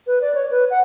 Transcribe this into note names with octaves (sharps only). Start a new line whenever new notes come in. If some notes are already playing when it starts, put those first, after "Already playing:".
B4
D5
C#5
B4
F#5